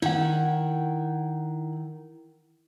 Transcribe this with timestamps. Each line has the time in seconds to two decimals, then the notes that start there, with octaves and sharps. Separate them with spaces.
0.02 D#3 E4 F#5